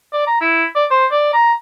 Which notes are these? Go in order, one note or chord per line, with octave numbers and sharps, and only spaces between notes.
D5
A#5
E4
D5
C5
D5
A#5